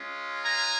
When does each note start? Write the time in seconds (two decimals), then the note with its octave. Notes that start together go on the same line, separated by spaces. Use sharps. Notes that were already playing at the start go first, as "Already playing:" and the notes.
Already playing: G#3 C#4 F4
0.43 G#5 A#5